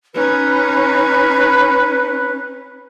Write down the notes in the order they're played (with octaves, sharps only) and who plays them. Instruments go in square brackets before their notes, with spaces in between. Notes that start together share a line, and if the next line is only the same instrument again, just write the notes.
[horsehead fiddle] C#4 D#4 [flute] B4